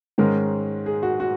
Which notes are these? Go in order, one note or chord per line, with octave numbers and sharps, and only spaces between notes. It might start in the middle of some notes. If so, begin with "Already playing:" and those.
G#2 D#3 G#3 C#4 A#4
G#4
F#4
F#4